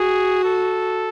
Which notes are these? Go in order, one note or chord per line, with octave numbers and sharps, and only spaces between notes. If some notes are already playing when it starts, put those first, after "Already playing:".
Already playing: F#4 G#4
A4